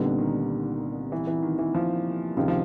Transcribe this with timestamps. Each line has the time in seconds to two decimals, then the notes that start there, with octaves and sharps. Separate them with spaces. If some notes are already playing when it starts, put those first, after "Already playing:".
Already playing: C2 A#2 D3 G3 B3 D#4
0.18 D#3
1.12 E3
1.27 E3
1.43 D#3
1.59 E3
1.75 F3
2.36 C#2 C3 D#3 F3
2.48 F3